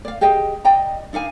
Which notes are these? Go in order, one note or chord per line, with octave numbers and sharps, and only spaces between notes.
D5 F5
G4 G#4 D#5 G5
D5 D#5 G5 A#5
D4 D#4 F5 G#5